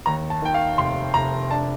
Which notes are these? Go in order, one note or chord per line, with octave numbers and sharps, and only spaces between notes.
D#2 A#5
A5
D#3 G5
F5
F1 C6
F1 A#5
D4 A5